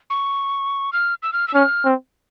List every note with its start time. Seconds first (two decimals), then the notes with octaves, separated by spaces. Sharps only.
0.10 C#6
0.93 F6
1.23 E6
1.33 F6
1.48 E6
1.54 C#4 F6
1.85 C4